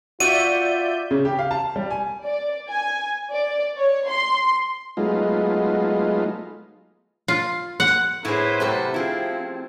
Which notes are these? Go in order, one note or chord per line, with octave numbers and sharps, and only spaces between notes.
F4 F#4 D5 E5 G6 D#7
C#3
G4
F5
A5
G3
G#5
D5
G#5
D5
C#5
C6
F#3 G#3 A3 B3 D#4 F4
F4
F#5
A2 B3 E4 G#4 B4 C5
C3 F#3 A3 A4 A#4
F3 C4 E4 G4 G#4